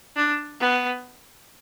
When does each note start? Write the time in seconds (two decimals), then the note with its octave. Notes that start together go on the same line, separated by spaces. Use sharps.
0.16 D4
0.60 B3